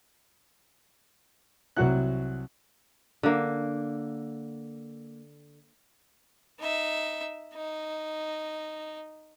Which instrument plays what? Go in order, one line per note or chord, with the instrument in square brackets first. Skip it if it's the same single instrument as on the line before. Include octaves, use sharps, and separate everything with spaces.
[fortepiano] C2 F#3 F#4 F#5 F#6
[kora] D3 A#3
[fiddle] D#4 E5
D#4